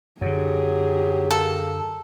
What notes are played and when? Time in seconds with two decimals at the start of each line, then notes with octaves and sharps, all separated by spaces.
0.21 F#2 D3 F#3 G4 G#4
1.31 A#3 A4